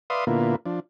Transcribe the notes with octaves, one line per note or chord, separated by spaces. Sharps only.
B4 D5 E5 F5 C6 D#6
A#2 D3 A#3 B3 E4 F4
F3 D4